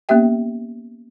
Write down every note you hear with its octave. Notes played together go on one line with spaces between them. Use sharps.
A#3 B3 C#4 G4 E5 G5